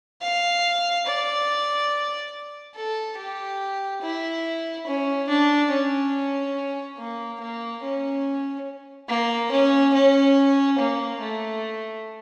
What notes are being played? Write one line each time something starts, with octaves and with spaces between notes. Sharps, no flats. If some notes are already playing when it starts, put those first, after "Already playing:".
F5
D5
A4
G4
E4
C#4
D4
C#4
A#3
A#3
C#4
A#3
C#4
C#4
A#3
A3